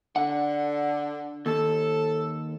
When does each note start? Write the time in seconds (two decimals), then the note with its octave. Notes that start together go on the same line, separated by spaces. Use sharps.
0.16 D3 F#5
1.46 D#2 A4